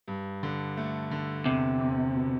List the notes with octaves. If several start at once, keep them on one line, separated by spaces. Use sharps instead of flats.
G2
D3
A3
D3
E2 C3
E2
B2